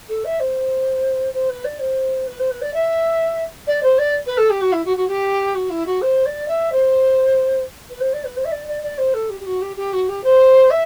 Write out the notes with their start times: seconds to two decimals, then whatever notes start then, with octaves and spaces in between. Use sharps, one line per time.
0.08 A4
0.24 E5
0.39 C5
1.33 C5
1.49 B4
1.64 D5
1.79 C5
2.26 B4
2.39 C5
2.50 B4
2.61 D5
2.73 E5
3.67 D5
3.82 C5
3.98 D5
4.26 B4
4.37 A4
4.50 G4
4.61 F#4
4.72 E4
4.85 F#4
4.96 F#4
5.08 G4
5.54 F#4
5.69 E4
5.86 F#4
6.01 C5
6.25 D5
6.48 E5
6.72 C5
7.89 B4
8.00 C5
8.13 D5
8.24 B4
8.36 C5
8.44 E5
8.51 D5
8.67 D5
8.82 D5
8.97 C5
9.13 A4
9.29 G4
9.40 G4
9.45 F#4
9.61 G4
9.76 G4
9.92 F#4
10.08 G4
10.23 C5
10.70 E5